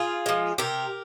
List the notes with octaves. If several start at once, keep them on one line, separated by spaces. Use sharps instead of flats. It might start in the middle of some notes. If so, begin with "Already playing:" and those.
Already playing: F4 G#4
F3 G#3
C3 G4 A#4